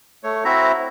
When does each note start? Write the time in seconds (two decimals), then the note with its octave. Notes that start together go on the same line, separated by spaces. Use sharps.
0.24 A3 C#5
0.45 C4 E4 F#4 E5 A#5